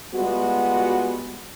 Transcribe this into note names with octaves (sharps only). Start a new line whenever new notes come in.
G3 G#3 B3 F4 F#4